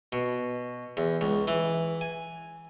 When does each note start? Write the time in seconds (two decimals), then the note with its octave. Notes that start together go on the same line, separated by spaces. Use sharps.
0.12 B2
0.97 E2
1.21 C#2
1.48 E3
2.01 G#5